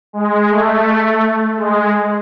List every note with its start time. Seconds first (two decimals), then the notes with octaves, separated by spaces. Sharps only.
0.13 G#3
0.50 A3
1.57 G#3